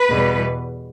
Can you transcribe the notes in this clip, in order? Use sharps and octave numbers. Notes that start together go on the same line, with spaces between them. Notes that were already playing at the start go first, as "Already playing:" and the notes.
Already playing: B4
E2 B2 G3